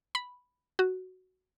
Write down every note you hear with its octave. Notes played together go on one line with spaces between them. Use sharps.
B5
F#4